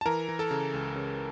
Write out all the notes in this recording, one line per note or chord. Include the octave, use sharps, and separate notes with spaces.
A5
E3 A#4 A#5
E3
A4 A5
C#3
C#2
C#3